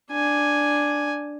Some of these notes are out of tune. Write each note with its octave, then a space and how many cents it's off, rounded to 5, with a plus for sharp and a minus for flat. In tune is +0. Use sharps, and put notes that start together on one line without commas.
D4 +0 G#5 +0